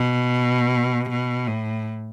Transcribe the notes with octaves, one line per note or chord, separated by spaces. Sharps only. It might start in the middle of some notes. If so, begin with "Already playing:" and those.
Already playing: B2
B2
A2